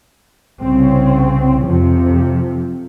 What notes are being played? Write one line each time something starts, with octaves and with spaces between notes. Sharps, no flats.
C2 C#3 C4 C#4
F2 C3 F3